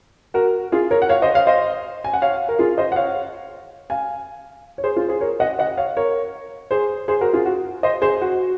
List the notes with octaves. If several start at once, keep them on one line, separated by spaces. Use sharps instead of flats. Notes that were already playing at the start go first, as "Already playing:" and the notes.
F#4 A#4
F4 G#4
A#4 C#5
F#5
C#5 F5
C5 D#5
C#5 F5
C5 D#5
G#5
F#5
C#5 F5
A#4
F4 G#4
C5 D#5
F#5
C#5 F5
F5 G#5
C#5
G#4 C5
F4 G#4
G#4 C5
A#4 C#5
D#5 F#5
D#5 F#5
C#5 F5
A#4 C#5
G#4 C5
G#4 C5
F#4 A#4
F4 G#4
F#4
C5 D#5
G#4 C5
F#4